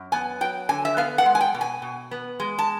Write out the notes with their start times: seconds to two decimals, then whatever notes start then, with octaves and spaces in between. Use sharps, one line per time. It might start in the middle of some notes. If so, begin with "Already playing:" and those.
Already playing: F#2
0.12 B3 G#5
0.41 F#3 G5
0.69 D3 G#5
0.85 E5
0.97 B3 F5
1.18 F#5
1.26 G#3
1.35 G#5
1.41 G5
1.54 B2
1.61 G#5
1.82 B2
2.11 B3
2.40 G#3
2.59 A5